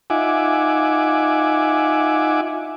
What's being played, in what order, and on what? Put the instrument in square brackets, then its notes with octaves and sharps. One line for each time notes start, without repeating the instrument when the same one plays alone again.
[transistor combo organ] D#4 F4 E5 F#5 G#5 D6